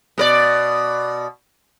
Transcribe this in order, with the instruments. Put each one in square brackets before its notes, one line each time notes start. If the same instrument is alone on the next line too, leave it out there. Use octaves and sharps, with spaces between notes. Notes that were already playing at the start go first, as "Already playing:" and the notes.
[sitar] B2 A#4 D5